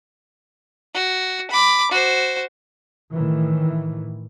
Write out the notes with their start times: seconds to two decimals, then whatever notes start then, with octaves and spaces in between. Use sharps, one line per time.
0.95 F#4
1.51 B5 D6
1.91 F#4 C5
3.12 A2 D#3 E3